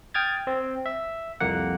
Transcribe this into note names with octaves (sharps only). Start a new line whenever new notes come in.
G5 D#6 F6 G#6 A6
C4
E5
C2 F2 A#3 F#5